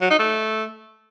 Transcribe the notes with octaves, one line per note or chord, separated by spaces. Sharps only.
F#3
D#4
A3